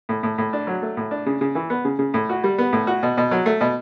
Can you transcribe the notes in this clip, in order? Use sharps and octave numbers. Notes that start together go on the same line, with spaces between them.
A2
A2
A2
D4
F#3
A3
A2
D4
C#3
C#3
E3
B3
C#3
C#3
A2
F#4
G3
B3
A2
F#4
B2
B2
F#3
A3
B2